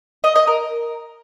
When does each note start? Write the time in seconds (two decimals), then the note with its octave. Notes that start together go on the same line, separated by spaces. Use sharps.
0.24 D#5
0.36 D#5
0.47 A#4